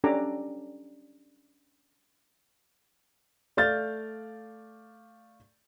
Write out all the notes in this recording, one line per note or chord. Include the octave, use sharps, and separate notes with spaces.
C#4 D4 G4 A4 A#5 D6
A3 D5 F5 F6 G6 A6